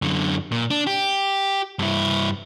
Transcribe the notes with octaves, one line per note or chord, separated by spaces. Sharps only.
F#2 D3
A#2
D4
G4
G2 E4